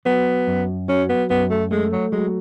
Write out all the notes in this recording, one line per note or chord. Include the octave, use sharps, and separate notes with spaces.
F#3 B3
F#2
F#3 C#4
B3
F#2 B3
A3
G#3 A3
F#3
F#3 G#3